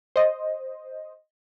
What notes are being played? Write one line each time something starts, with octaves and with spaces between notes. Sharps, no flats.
C5 D#5